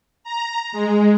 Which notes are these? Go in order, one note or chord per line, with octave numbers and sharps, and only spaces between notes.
A#5
G#3